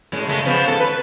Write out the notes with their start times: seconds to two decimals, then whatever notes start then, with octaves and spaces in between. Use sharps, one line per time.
0.12 F#2 A2 G#3
0.27 C#3 G#3 A3
0.45 C#3 F3 B3
0.66 G#2 A4
0.80 B4